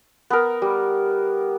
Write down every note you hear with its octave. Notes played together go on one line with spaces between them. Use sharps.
B3 A#4
G3